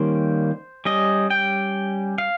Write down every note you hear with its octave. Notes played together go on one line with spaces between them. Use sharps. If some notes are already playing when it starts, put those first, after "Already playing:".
Already playing: D#3 G3 A#3 C#4 C5
G3 C#4 D#5
G5
F5